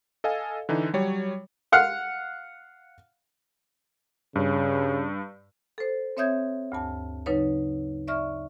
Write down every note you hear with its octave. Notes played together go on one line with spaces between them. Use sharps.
A4 D#5 F5 G#5
D3 E3 D#4
F#3 G3 C#5
F5 F#5 F6
G2 C#3
A4 C5
C4 C#5 E5 D#6 G6 G#6
D2 G2 A5
C#3 F#3 D#4 B4 C#5
D5 E5 C#6 F6